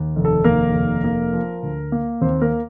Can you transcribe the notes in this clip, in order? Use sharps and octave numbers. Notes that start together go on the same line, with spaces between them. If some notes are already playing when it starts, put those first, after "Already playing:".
Already playing: D#2
F1
A4
D#2 A#3 A#4
F1
A#3
F3
D2
A#3
D#2 C4 C5
A#3 A#4